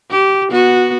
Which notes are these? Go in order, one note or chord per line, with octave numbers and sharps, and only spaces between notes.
G4
B3 F#4